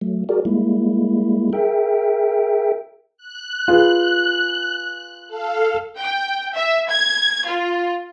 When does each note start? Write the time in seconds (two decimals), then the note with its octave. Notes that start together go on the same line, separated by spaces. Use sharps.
0.01 F#3 A3
0.29 F#4 G#4 A#4 D5
0.45 G3 G#3 A#3 E4
1.53 G#4 A#4 E5 G5
3.17 F#6
3.68 F4 G#4 B4
5.28 A4 F5
5.98 G5
6.56 E5
6.89 G#6
7.48 F4